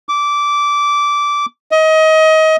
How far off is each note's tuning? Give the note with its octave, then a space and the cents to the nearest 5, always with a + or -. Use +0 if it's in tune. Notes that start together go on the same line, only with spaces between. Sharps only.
D6 -15
D#5 +25